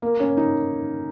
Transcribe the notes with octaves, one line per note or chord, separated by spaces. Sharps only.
A#3
C#4
D#4